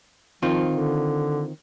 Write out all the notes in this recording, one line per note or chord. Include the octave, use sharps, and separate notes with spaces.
D#3 F3 C4 F4
D3